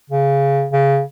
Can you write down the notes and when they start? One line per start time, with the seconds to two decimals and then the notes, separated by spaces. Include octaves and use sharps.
0.10 C#3
0.72 C#3